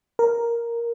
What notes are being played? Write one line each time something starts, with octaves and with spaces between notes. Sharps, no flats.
A#4